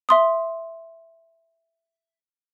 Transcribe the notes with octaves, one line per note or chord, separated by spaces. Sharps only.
E5 C6 D#6